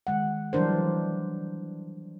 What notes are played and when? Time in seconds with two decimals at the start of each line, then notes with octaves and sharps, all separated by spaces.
0.07 D#3 G#3 F#5
0.53 E3 F#3 G3 D4 A#4 C5